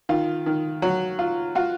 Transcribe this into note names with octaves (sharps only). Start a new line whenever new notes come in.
D#3 F4
D#3
F#3
F4
F4 F#4